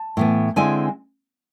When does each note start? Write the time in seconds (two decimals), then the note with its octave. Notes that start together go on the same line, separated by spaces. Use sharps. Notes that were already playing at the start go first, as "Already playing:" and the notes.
Already playing: A5
0.17 A2 E3 B3
0.56 D3 G#3 C4 E4 G#5